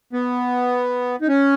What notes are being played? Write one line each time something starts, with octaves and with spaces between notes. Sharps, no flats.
B3
D#4
C#4